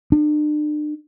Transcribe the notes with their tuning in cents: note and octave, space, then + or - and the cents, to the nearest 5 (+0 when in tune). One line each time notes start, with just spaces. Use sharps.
D4 +40